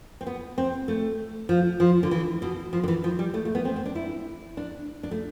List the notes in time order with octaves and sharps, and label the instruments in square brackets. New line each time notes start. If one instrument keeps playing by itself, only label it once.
[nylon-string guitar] C4
B3
C4
A3
F3
F3
D3
E3
B2
F3
D3
E3
F3
G3
A3
A3
B3
C4
C4
D4
E4
D4
D4
A3